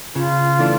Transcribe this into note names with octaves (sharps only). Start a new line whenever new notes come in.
C#3 F4
E3 A3 D4